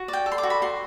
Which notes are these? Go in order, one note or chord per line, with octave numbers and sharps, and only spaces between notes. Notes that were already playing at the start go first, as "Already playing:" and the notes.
Already playing: F#4
D5
G5
A4
C6
D6
F#4
B5
F#4 C6